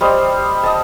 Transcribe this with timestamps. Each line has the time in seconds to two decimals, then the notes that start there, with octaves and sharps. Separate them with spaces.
0.01 G3 C5 D#5
0.63 D#5 A5